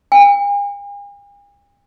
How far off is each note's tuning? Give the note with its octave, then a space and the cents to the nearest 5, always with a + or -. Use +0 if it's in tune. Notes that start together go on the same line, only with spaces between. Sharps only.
G#5 -45